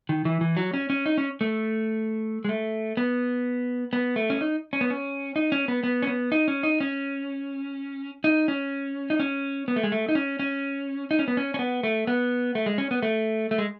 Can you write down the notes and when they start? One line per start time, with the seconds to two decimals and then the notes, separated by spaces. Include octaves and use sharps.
0.09 D#3
0.25 E3
0.41 E3
0.57 F#3
0.74 C#4
0.90 C#4
1.06 D#4
1.18 C#4
1.41 A3
2.45 G#3
2.49 A3
2.97 B3
3.93 B3
4.16 A3
4.30 C#4
4.41 D#4
4.73 C#4
4.81 B3
4.90 C#4
5.36 D#4
5.52 C#4
5.68 B3
5.84 B3
6.02 C#4
6.07 B3
6.32 D#4
6.48 C#4
6.63 D#4
6.80 C#4
8.24 D#4
8.48 C#4
9.10 D#4
9.20 C#4
9.68 B3
9.76 A3
9.83 G#3
9.92 A3
10.09 D#4
10.15 C#4
10.39 C#4
11.11 D#4
11.19 C#4
11.28 B3
11.37 C#4
11.54 C#4
11.59 B3
11.83 A3
12.07 B3
12.55 A3
12.66 G#3
12.78 C#4
12.91 B3
13.03 A3
13.51 A3
13.58 G#3